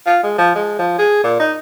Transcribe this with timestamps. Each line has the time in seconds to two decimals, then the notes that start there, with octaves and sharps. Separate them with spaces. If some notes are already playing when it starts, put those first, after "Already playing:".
0.07 F4
0.23 G#3
0.38 F3
0.55 G#3
0.79 F3
0.99 G#4
1.24 A#2
1.40 D#4